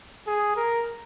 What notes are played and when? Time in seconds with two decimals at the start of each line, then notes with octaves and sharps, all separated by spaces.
0.27 G#4
0.57 A#4